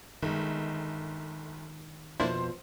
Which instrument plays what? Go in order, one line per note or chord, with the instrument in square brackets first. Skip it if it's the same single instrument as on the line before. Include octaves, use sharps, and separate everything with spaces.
[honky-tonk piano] G1 [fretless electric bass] D#3 G#3
[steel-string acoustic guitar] F2 B2 F3 [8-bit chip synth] A#3 D4 E4 [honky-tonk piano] C5